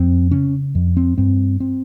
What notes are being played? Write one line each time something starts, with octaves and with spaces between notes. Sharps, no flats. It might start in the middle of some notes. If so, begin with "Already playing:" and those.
Already playing: F2 C4
C#3 C#4
F2
C4
G2 C4
C4